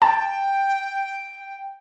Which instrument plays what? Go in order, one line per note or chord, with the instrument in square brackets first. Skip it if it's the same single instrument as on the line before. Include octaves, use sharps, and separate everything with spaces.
[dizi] G5 [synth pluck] A5